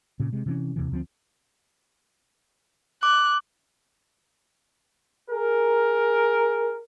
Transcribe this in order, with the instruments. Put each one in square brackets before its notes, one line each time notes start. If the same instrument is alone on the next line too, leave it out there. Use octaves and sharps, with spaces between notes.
[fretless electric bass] A#2 C#3
C3 G#3
C3 E3 C#4
D#2 C3 E3
D2 F3 G3 C4
[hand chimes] D6 [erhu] F#6
[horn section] G#4 A#4